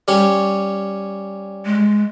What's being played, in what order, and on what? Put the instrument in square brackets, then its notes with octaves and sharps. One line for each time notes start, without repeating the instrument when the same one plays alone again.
[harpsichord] G3 C#4 C#5
[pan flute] G#3